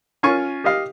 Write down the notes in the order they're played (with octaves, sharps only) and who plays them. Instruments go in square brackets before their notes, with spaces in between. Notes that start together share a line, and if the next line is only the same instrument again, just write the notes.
[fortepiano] C#4 F4 G#5 C#6
G4 D#5 F5